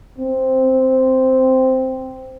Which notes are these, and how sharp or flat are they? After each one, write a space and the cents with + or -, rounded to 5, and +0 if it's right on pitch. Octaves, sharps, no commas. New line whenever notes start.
C4 -5